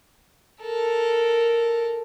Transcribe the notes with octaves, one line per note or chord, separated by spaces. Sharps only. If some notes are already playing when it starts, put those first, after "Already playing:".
A4 A#4